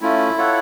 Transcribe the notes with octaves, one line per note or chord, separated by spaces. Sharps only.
A3 C#4 E4 F4
F4 A4 C#5 F#5